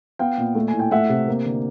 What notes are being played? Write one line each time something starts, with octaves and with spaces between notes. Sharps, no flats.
B3 F5 G5
A#2
A3
G#5
A2
G5
A3 E5 F#5
C3
A#3
D3